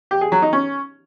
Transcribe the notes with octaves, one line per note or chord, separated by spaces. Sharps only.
G4
G#4
F#3
D#4
C#4